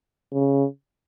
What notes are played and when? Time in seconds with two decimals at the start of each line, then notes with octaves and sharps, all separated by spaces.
0.33 C#3